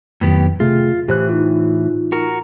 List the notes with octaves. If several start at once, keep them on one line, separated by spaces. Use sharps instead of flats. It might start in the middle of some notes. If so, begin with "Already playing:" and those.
F2 A2 D#3 F#3 B3 G4
C3 A3 F4 G#4
A2 E3 G4 C5 F#6
D#4 F4
F#4 A#4